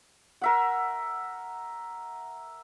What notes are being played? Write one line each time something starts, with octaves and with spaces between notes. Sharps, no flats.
A#4 E5 F#5